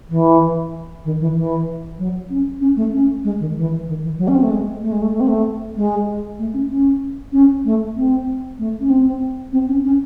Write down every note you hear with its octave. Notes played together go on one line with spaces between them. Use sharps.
E3
D#3
E3
E3
F#3
C#4
C#4
A3
C#4
G#3
D#3
E3
D#3
E3
F#3
C#4
C4
A3
G#3
A3
G#3
A3
A3
C4
A3
G#3
A3
C#4
C#4
C#4
A3
C4
A3
C#4
C4
C4
C#4
C#4